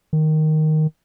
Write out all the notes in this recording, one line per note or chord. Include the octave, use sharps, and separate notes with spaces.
D#3